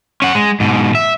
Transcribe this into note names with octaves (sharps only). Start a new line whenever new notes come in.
C#4 F#5
G#3
G#2 B2
E5